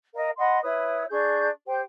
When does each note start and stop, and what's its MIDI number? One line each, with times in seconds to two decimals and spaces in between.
0.14 0.29 70
0.14 0.29 75
0.14 0.29 77
0.38 0.58 75
0.38 0.58 78
0.38 0.58 83
0.38 0.58 84
0.62 1.04 64
0.62 1.04 71
0.62 1.04 73
0.62 1.04 87
1.09 1.47 62
1.09 1.47 68
1.09 1.47 85
1.09 1.47 91
1.67 1.79 67
1.67 1.79 72
1.67 1.79 79